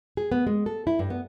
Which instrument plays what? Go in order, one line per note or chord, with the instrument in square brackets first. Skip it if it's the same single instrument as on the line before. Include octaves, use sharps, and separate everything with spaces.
[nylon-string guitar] G#4
B3
G#3
A4
E4
G2
B3